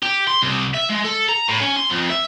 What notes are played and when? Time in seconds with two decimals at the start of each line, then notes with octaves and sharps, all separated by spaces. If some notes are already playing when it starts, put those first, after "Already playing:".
0.03 G4
0.28 C6
0.42 C2
0.74 E5
0.90 G#3
1.05 A4
1.29 A#5
1.49 A2
1.61 C#4
1.77 C6
1.90 F2
2.10 E5